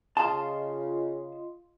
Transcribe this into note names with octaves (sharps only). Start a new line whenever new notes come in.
C#3 F4 D#5 A5 C6